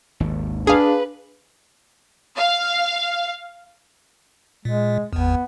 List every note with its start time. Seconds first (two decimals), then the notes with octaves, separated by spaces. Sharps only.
0.20 G#1 D#2
0.67 D4 G#4 B4 F5
2.36 F5
4.65 A#2 G#3
5.13 G#1 E2 B3